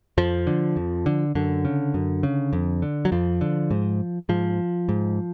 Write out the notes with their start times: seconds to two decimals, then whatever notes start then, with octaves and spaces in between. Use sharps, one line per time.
0.18 F2 F3
0.47 D3
0.76 F2
1.06 D3
1.35 F#2 D3
1.65 C#3
1.94 F#2
2.23 C#3
2.53 F2
2.82 D3
3.05 F#3
3.12 F2 F3
3.41 D3
3.71 G#2
4.29 G#2 F3
4.89 G#2